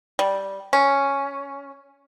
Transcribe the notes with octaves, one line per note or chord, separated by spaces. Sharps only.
G3
C#4